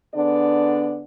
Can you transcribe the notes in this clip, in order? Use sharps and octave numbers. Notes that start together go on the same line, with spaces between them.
D3 B3 D4 G#4 D5